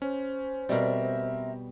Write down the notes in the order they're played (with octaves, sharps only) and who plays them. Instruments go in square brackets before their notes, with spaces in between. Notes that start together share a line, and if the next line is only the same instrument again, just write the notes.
[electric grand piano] C#4 [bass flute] C5
[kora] B2 G3 [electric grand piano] C4 A#4 [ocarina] E5